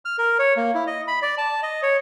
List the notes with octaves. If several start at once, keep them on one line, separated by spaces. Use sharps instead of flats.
F6
A#4
C#5
A#3
E4
D#5
B5
D5
A5
D#5
C#5